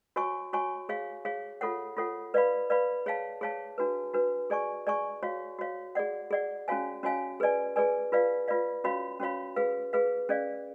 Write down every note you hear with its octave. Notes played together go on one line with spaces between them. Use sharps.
F#4 C#5 G#5 C#6
F#4 C#5 G#5 C#6
G#4 C#5 F5
G#4 C#5 F5
F4 A4 C#5 F#5
F4 A4 C#5 F#5
B4 D5 F5 B5
B4 D5 F5 B5
G#4 C#5 F5 A5
G#4 C#5 F5 A5
D4 F#4 B4
D4 F#4 B4
G#4 D5 G#5 C#6
G#4 D5 G#5 C#6
F#4 C#5 F5
F#4 C#5 F5
G#4 D5 F#5
G#4 D5 F#5
C#4 F#4 C#5 F5 G#5
C#4 F#4 C#5 F5 G#5
G#4 B4 D5 G#5
G#4 B4 D5 G#5
F4 B4 D5 F5
F4 B4 D5 F5
C#4 F#4 C#5 F5 B5
C#4 F#4 C#5 F5 B5
G#4 B4 F5
G#4 B4 F5
C#4 G#4 D5 F5